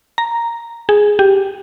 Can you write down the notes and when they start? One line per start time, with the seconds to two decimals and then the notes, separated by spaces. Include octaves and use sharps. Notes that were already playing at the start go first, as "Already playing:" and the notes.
0.18 A#5
0.89 G#4
1.19 G4